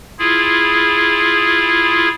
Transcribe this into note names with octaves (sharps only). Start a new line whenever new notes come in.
E4 F4 G#4